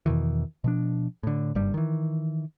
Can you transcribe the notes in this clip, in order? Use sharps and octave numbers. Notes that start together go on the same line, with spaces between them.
E2 B2 D#3 E3
B2 F3 D4
A2 D3
F#1 G2 G3
D#3 E3